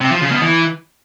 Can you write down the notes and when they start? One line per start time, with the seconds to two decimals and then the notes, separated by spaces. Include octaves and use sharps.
0.01 C3
0.11 F3
0.21 C#3
0.32 B2
0.42 E3